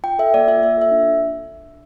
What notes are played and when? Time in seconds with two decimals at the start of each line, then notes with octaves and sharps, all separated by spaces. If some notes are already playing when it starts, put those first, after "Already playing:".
0.04 F4 G5
0.19 A4 E5
0.34 A#3 D5
0.47 F4 E5
0.62 A#3 E5
0.77 A4 E5
0.91 D4